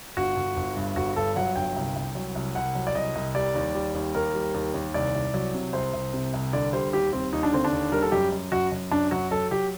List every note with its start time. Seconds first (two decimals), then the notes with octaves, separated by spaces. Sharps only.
0.17 G1 F#4
0.37 G1
0.57 G1
0.77 G2
0.96 G1 F#4
1.16 G2 A4
1.36 F#3 F#5
1.56 G1 G5
1.76 C2
1.96 C2
2.15 F#3
2.35 C2
2.55 C2 F#5
2.75 F#3
2.87 D5
2.95 C2 D#5
3.15 C2
3.35 G3 D5
3.55 D#2
3.75 G3
3.95 D#2
4.14 D#2 A#4
4.34 G3
4.54 D#2
4.74 D#2
4.94 C2 D5
5.14 C2
5.34 F#3
5.54 C3
5.73 C2 C5
5.94 C2
6.13 C3
6.33 C2
6.53 D3 D5
6.73 G3 C5
6.93 D#2 G4
7.13 G3 C4
7.33 D#2 D#4
7.43 D4
7.52 D3 C4
7.65 D4
7.72 D#2
7.92 G3 A#4
8.02 A4
8.12 F#2 G4
8.32 F#2
8.52 F#2 F#4
8.72 F#2
8.91 F#2 D4
9.11 F#3 F#4
9.31 F#3 A4
9.51 F#3 G4